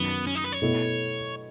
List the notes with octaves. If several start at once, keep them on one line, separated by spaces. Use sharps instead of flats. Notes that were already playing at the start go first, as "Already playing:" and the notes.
Already playing: F#2 D#3 F#3 B3
C#4
D#4
B4
C#5
B2 A3 E4 A4